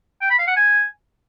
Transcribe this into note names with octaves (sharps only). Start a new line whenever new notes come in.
G5
B5
F5
F#5
G#5